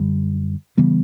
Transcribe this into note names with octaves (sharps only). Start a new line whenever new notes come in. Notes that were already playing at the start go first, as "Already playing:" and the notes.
Already playing: F#2 D3 G3
C#3 E3 G3 B3